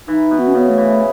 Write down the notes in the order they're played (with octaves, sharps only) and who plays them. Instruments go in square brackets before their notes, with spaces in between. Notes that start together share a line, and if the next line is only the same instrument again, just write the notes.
[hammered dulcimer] E3 [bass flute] D#4
[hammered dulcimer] B2
[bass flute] B3
C#4
[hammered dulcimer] C#3 [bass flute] B3
[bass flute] A3
[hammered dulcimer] E3